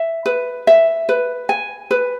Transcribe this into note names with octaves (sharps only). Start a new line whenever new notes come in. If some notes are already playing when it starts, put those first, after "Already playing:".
Already playing: E5
B4
E5
B4
G#5
B4